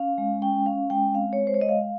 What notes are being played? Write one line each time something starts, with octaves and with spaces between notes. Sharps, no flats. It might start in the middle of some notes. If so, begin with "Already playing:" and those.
Already playing: C#4 F5
G#3
C#4 G5
C#4 F5
G#3 G5
C4 F5
C#5
G#3
C5
C#5
G#3 D#5
F5